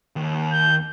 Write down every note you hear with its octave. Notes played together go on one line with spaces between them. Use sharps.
D#2
G6